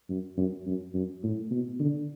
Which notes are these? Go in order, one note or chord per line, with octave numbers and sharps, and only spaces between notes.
F#2
F#2
F#2
F#2
A2
B2
D3